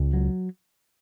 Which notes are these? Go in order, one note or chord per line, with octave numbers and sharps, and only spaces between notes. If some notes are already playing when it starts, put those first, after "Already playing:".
Already playing: C#2
F#3